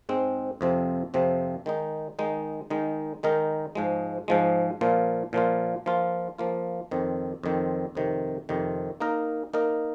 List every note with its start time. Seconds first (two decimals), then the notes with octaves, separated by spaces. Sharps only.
0.09 G#2 G#3 C4
0.61 F2 C3 F3 C4
1.14 F2 C3 F3 C4
1.66 D#3 G#3 D#4
2.19 D#3 G#3 D#4
2.70 D#3 G#3 D#4 A#4
3.23 D#3 G#3 D#4 A#4
3.75 G#2 F3 G#3
4.28 G#2 F3 G#3
4.81 A#2 F3 A#3 F4
5.33 A#2 F3 A#3 F4
5.86 F3 A#3 F4
6.38 F3 A#3 F4
6.91 F2 D#3 C4
7.43 F2 D#3 C4
7.95 F2 C3 D#3
8.49 F2 C3 D#3
9.00 A#3 D#4 A#4 D#5
9.54 A#3 D#4 A#4 D#5